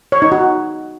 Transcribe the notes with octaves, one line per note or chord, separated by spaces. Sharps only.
C#5
D#4
F#4